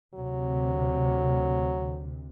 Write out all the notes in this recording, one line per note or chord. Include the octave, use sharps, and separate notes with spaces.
D2 C3 F#3